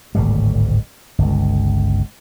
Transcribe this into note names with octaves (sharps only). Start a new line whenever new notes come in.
D1 G#1 B2 G3
G1 C#2